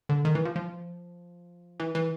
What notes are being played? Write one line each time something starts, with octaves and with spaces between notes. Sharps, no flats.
D3
D#3
E3
F3
F3
E3
E3